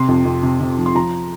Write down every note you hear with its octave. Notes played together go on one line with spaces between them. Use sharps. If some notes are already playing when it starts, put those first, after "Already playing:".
Already playing: C3 C6
F2
F2
C3
C3
F3
C6
F3 A#5